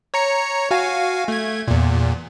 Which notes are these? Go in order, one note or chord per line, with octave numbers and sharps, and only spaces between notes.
C#5 A#5 C#7
F#4 F5 G#5
A3 G#6
E2 A#2